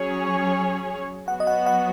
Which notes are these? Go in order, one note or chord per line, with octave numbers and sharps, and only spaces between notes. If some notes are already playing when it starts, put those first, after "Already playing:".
Already playing: F#3 C#4 G#4 C#5
F#3 B3 F#4 F#5
D#5
F#5
F#5